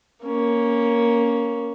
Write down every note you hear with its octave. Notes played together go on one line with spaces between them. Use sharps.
A#3 C#4